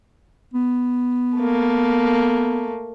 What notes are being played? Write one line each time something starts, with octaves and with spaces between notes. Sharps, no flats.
B3
A3 A#3